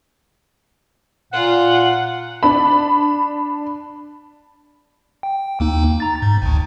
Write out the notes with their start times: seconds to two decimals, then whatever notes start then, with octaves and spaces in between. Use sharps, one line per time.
1.33 A#2 F4 F#5
2.43 D4 B5
5.23 G5
5.60 D#2 A#3 D#4
6.00 A#5 A6
6.22 G#2
6.42 G#1 D2